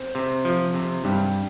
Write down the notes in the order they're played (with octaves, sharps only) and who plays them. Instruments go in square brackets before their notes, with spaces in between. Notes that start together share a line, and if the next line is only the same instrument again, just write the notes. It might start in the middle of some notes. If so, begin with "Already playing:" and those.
Already playing: [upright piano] C4 C5
[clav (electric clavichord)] C3
F3
C3
[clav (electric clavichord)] G2 [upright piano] G3 G4